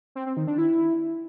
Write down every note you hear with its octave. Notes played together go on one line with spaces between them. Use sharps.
C4
C4
D#3
D4
E4